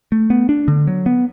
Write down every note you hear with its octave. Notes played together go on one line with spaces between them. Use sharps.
A3
B3
D4
D3
F#3
B3